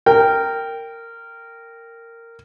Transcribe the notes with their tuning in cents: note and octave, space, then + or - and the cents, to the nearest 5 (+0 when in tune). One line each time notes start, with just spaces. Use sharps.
A#4 -15 G5 +0